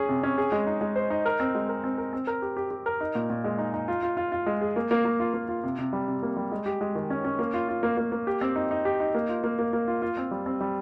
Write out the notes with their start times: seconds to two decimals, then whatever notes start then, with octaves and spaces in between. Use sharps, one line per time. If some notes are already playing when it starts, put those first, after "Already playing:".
Already playing: C#4 G#4
0.09 C3
0.23 C#4
0.38 G#4
0.52 G#3
0.67 D#4
0.81 G#3
0.96 C5
1.10 D#4
1.26 A#4
1.40 C4
1.55 G#3
1.69 A#4
1.84 C4
1.98 A#4
2.13 C4
2.27 A#4
2.42 G4
2.57 G4
2.71 G4
2.86 A#4
3.01 D#4
3.15 A#2
3.30 A#2
3.44 G#3
3.59 D#4
3.74 D#4
3.88 F4
4.03 F4
4.17 F4
4.32 F4
4.46 G#3
4.61 G#4
4.76 A#3
4.91 A#3
5.05 A#3
5.20 F4
5.34 A#3
5.49 F4
5.64 C3
5.78 C3
5.93 G3
6.08 C3
6.23 A#3
6.37 G3
6.51 G#3
6.66 G4
6.81 G#3
6.95 D#3
7.10 C#4
7.24 C#4
7.39 A#3
7.54 F4
7.69 F4
7.83 A#3
7.97 A#3
8.12 A#3
8.27 G4
8.41 C4
8.56 D#4
8.71 D#4
8.85 G4
9.00 D#4
9.15 A#3
9.29 F4
9.44 A#3
9.59 A#3
9.73 A#3
9.88 F4
10.02 F4
10.17 C4
10.31 G3
10.46 C4
10.61 G3